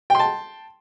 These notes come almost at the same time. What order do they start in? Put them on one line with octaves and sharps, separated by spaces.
G5 C6 A5